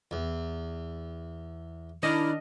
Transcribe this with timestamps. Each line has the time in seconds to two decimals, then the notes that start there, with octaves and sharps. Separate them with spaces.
0.11 E2
2.03 D#3 D4 E4 D#5 F6